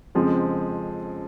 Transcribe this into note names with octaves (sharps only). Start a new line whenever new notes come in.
F2 C#3 F3 G#3 C4